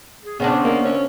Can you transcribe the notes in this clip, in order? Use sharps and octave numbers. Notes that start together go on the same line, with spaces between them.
G#4
C#3 B3 C4 D4
A#3
C#4